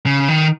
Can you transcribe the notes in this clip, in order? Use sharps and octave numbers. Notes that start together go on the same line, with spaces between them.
C#3
D#3